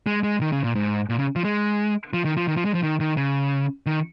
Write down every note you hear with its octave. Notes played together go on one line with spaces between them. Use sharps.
G#3
G#3
D#3
C#3
A#2
G#2
A#2
C#3
F3
G#3
F3
D#3
F3
D#3
F3
G#3
F3
D#3
D#3
C#3
D#3